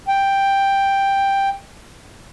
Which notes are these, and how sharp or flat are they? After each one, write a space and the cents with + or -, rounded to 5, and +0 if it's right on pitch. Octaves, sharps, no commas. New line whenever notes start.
G5 +5